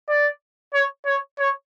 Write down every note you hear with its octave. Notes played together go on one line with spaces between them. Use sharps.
D5
C#5
C#5
C#5